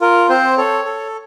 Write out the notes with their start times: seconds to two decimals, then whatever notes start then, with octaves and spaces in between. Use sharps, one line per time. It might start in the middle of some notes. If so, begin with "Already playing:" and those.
0.01 F4 A#4
0.29 C4 C5
0.57 A4 C#5
0.85 A4